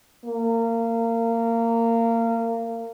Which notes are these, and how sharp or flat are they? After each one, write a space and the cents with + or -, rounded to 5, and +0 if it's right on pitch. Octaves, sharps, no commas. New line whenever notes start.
A#3 -25